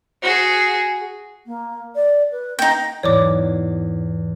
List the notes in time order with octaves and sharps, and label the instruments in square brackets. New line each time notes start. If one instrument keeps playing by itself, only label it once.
[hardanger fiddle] F#4 G#4
[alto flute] A#3
D5
B4
[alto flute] A#3 [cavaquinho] D#4 G5
[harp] E2 G#2 [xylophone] C#5 D5 D6